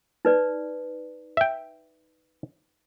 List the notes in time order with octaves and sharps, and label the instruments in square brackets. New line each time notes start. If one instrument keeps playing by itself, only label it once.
[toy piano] D#4 B4 D5
[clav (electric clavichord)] E5 G5